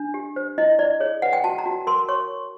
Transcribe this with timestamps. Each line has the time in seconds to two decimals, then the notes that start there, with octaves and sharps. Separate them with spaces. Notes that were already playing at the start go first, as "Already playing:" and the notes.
Already playing: D4
0.14 G4
0.36 C5
0.58 E4 D#5
0.79 E4 D5
1.00 G#4 C#5
1.22 B4 F#5
1.33 G5
1.44 F#4 A5
1.59 A#5
1.66 F#4
1.87 A#4 C6
2.09 C#5 C#6